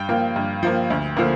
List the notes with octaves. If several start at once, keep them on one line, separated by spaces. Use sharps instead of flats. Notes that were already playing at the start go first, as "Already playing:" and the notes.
Already playing: G2 G5
F3 A#3
G2
F3 A#3
D2
D3 F3 A#3